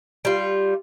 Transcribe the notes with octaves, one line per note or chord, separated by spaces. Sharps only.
G3 F4